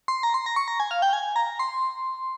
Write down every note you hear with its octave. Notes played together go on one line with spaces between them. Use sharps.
C6
A#5
C6
A#5
C#6
A#5
G#5
F5
G5
G#5
A#5
C6